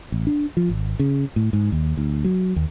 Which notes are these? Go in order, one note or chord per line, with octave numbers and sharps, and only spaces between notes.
A1
D4
F3
G#1
C#3
A2
G#2
D#2
D2
F#3
D#2